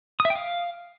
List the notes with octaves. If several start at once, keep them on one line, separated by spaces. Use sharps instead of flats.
D#6
E5
G5
F5